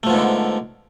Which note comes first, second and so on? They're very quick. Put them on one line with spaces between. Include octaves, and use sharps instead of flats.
A3 F3 B3 G#2 D3